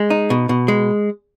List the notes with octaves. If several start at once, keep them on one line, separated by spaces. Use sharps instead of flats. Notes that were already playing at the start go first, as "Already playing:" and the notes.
Already playing: G#3
D#4
B2
B2
G#3